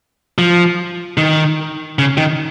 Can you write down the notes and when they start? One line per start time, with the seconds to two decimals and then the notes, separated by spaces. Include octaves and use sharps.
0.38 F3
1.17 D#3
1.99 C#3
2.17 D#3